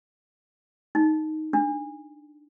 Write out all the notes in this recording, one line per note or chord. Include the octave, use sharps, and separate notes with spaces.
D#4
D4